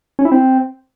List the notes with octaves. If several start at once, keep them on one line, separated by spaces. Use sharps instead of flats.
C#4
E4
C4